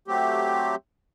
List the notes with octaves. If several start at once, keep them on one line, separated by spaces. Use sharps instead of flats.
F#3 A3 C4 G4